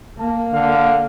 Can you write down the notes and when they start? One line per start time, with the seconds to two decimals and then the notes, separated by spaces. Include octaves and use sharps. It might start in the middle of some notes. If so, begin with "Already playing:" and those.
0.19 A#3 A5
0.53 D3 F5